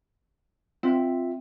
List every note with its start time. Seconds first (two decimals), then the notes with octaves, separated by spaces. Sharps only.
0.83 C4 F4 E5